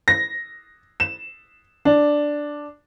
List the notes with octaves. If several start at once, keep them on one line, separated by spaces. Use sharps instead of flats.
A#6
E7
D4